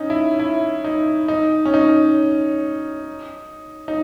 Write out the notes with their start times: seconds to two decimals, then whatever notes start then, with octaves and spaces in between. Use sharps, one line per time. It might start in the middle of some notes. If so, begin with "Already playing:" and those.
Already playing: C#4 D#4
0.10 E4
0.40 E4
0.84 D#4
1.28 D#4
1.65 C#4
1.74 D#4
3.88 D#4